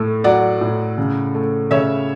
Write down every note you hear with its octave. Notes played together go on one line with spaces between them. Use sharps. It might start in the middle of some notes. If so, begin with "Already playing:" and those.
Already playing: A2 A3
F#3 D5 F#5
A2
C#3
A3
C#3 C#5 E5